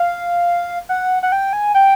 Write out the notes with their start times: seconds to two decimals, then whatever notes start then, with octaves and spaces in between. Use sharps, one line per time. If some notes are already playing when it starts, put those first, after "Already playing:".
Already playing: F5
0.89 F#5
1.23 F#5
1.32 G5
1.53 G#5
1.75 G5